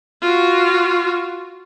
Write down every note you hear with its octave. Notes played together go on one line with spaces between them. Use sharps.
F4 F#4